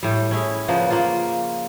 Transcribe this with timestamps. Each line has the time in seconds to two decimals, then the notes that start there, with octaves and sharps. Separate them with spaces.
0.03 A2 G3
0.31 C#4 E4 G#4
0.68 C#3 F3 A#3 B3
0.91 A#3 F4